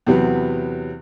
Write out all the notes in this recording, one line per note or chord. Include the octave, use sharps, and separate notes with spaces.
E2 C3 F#3 B3